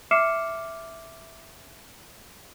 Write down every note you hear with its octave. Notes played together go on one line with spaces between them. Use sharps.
E5 D6 F6 C7 C#7 E7